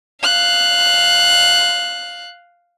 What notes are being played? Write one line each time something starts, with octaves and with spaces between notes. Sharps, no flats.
F5 F#6